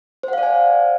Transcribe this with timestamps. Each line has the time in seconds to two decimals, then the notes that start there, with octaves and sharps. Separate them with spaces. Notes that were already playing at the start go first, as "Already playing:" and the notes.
0.23 C5
0.28 F#5
0.33 F5
0.38 D5
0.43 G#5